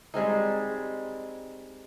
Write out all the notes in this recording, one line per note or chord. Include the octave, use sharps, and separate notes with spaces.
G3 G#3 C4 D#4